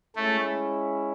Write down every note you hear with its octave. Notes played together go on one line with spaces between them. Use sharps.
G#3 A3 C#4 E4